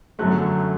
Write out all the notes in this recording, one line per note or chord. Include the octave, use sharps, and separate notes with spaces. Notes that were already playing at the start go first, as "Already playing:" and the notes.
F#2 D3 F#3 A3 F#6